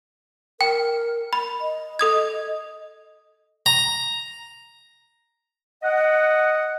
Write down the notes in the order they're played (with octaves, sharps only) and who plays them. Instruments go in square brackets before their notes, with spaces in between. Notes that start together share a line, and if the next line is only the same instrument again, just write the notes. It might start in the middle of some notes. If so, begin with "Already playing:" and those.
[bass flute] A#4 [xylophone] G5
[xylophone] B5
[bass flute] D#5
[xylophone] A4 D#6 G#6
[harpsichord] A#5
[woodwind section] D#5 F#5